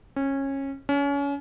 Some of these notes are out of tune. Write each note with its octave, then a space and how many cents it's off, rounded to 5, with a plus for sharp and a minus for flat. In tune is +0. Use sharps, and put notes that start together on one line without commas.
C#4 -20
C#4 +30